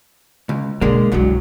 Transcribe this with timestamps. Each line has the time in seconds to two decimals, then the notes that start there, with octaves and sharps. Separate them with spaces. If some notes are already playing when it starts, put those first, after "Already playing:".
0.49 C#2
0.81 B2 D3 G#3 A#3
1.12 C2 G2 F#3 G#3